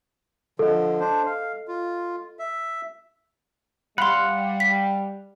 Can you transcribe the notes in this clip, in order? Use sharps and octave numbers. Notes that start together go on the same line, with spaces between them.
D3 F3 A4 D#5
D4 C5
F5
F4
E5
G3 F5 F#5 B5 C6
B6